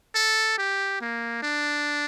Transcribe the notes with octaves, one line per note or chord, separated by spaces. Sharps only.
A4
G4
A#3
D4